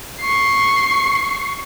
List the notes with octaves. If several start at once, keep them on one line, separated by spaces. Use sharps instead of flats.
C#6 C7